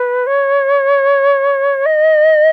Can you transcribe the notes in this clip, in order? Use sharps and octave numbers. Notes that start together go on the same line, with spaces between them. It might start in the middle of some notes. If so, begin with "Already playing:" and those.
Already playing: B4
C#5
D#5